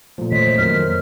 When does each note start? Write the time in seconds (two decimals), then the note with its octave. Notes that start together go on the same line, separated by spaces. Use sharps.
0.18 A#2 F3 A3
0.32 E3 A3 A#3 C5 C#5 D#5 B6
0.58 F2 D#3 F#3 B3 A#4 F6
0.86 A#3